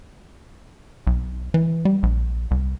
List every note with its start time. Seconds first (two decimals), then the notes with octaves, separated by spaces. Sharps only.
1.07 B1
1.54 E3
1.85 G3
2.03 A#1
2.51 C2